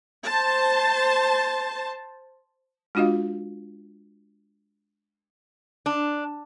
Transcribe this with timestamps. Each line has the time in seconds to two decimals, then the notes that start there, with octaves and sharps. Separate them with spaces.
0.25 C5 A5
2.95 G#3 D4 F4 F#4 D#5 F5
5.86 D4